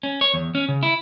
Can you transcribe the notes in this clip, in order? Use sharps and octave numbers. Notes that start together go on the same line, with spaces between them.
C#4
C#5
E2
C#4
C#3
E4